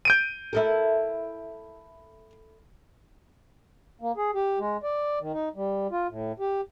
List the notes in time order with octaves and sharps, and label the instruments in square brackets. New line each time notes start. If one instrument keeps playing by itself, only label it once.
[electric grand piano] G6 D7 D#7
[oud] E4 A4 A#4
[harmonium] A#3
G#4
G4
G#3
D5
D#3
D#4
G3
F4
A2
G4